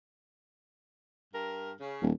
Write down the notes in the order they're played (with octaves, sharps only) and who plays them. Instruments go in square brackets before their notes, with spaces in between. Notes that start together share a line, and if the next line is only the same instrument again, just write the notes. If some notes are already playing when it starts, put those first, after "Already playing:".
[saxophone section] G2 A#4
C#3
[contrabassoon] D#1